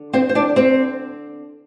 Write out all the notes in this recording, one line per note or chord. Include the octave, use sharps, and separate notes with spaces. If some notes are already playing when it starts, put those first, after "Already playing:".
Already playing: D3
C4 C5
C5
D4 D5
C4 C5